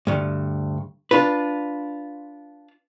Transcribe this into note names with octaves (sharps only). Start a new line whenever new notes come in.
D2 G2
D4 F4 B4